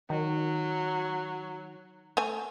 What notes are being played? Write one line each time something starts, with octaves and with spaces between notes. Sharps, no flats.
D#3 F#3
A3 G#5